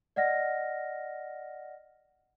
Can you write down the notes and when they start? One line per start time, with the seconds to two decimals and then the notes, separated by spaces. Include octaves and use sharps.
0.16 D5 D#5 F#5 F6 A#6